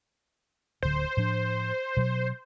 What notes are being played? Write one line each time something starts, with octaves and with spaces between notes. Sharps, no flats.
D1 D3 C5
A2 F3 D4
B2 F#3